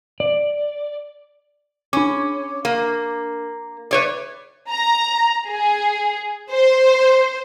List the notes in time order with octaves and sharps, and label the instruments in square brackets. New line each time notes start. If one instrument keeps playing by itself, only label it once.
[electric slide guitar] D5
[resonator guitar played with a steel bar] C#4 [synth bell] D4 D6
[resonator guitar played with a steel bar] A#3
B4 C#5 D5
[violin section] A#5
G#4
C5